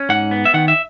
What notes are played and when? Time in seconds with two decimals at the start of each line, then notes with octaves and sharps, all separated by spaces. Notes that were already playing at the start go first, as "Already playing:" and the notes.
Already playing: C#4
0.09 G#2 F#5
0.31 B3
0.45 E5
0.54 D#3 F#5
0.68 E5